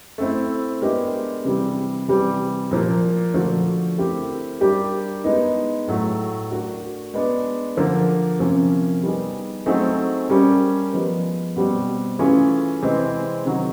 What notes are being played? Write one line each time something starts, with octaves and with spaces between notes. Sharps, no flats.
A3 C4 E4
G#3 B3 D4 G4 A#4
C3 E3 G3
C3 E3 G3
A#2 F3 A#3
D3 F3 A3 D4 F#4
A3 C4 E4 G4 A#4
G3 A#3 D4 G4
G#3 B3 D#4
A2 F#3 A3
A3 D4 F#4 A#4
G#3 B3 D4
D3 F3 A#3
C3 F3 A#3 C#4
G3 B3 D#4 G#4
F#3 A3 C4 D#4 G#4
G3 A#3 C#4
F3 G#3 B3
B2 G3 C4
E3 A3 C#4 F4 G#4
C3 E3 G#3 C4
C3 D#3 F#3